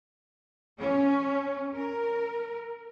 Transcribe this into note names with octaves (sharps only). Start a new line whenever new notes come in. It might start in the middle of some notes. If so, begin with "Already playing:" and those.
C#4
A#4